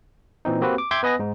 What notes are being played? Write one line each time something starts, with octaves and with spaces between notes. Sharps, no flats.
A#2 E3 C4 D#4
A#3 C4 F#4 G4 B4
D6
E5 G5 C6 D6 G6 G#6
B3 B4 D#5 G#5 D#6 A#6
G#2 D#4